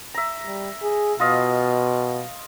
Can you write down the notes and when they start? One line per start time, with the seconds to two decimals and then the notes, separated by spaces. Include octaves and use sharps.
0.14 E5 A#5
0.46 G3
0.82 G#4
1.20 B2 F4 D#5 F5